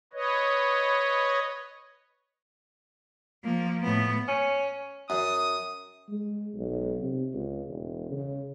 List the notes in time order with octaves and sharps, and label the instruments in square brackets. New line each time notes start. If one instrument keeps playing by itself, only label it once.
[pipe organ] B4 C#5 D#5
[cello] F3 A#3
A2 B3
[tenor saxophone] C#4
[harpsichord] F#2 [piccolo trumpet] D#6
[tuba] G#3
B1
C3
C#2
E1
C#3